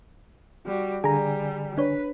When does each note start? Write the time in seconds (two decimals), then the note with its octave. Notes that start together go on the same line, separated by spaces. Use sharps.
0.66 G3 F#4
1.04 D3 G3 G#4 G#5 A#5
1.78 D4 B4 C#5